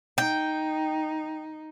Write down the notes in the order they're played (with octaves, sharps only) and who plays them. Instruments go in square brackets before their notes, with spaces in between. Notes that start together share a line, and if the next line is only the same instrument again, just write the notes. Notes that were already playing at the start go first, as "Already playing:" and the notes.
[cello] D#4 [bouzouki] G5